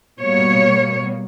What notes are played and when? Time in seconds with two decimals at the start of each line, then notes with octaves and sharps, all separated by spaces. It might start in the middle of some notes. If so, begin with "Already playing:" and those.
0.20 B2 G3 A#3 C#5